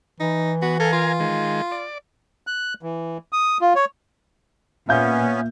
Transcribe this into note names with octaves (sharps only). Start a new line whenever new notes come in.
E3 D#4
B3 F#4
A4 A#4 F5 G#5
F4
D#3 G#3
D5
F#6
E3
D#6
F4
C#5
A#2 B3 C#4 E5 F5 G6